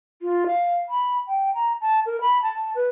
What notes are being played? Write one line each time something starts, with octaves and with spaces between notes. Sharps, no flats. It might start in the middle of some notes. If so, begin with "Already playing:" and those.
F4
F5
B5
G5
A#5
A5
A#4
B5
A5
B4